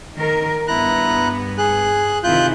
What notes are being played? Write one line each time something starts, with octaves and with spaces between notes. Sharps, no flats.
D#3 A#4
G2 B3 E4 A#5 F#6
G#4 F#6
C3 D#3 E4 F4 F#6 G6